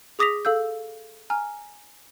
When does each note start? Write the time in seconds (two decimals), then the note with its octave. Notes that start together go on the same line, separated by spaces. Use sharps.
0.19 G#4 D6 D#6 A#6 B6 F7
0.45 A4 F5 E6 G6
1.30 G#5 A#5 F6